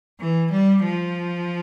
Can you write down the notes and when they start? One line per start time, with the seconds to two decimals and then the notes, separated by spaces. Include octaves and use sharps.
0.20 E3
0.51 G3
0.83 F3